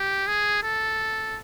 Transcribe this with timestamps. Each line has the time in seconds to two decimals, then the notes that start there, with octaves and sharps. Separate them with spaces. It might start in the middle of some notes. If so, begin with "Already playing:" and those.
Already playing: G4
0.27 G#4
0.63 A4